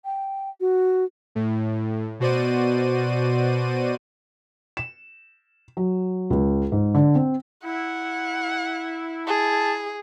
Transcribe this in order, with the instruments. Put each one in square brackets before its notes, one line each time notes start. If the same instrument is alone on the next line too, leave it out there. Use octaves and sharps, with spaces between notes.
[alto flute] G5
F#4
[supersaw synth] A2
B2 F#4 C5 D5 D#7
[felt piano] E7
F#3
C#2
G#2
D3
C4
[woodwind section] E4 [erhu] F#5
[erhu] G#4 [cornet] A5